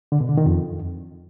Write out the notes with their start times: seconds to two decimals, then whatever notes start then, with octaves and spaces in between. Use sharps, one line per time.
0.12 D3
0.20 B2
0.29 D3
0.38 D#3
0.46 F2